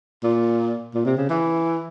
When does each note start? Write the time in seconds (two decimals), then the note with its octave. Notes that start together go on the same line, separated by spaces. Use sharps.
0.23 A#2
0.94 A#2
1.05 C3
1.17 C#3
1.29 E3